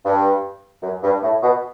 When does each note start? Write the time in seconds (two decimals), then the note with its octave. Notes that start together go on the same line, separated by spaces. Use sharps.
0.05 G2
0.83 F#2
1.03 G2
1.22 A2
1.42 B2